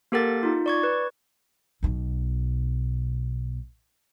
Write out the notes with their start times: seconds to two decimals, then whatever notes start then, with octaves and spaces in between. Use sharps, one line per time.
0.12 A#3 G4 A4 A#4 F#5 A6
0.43 D#4 F4
0.66 D5 C#6 G#6
0.83 B4
1.83 B1 B2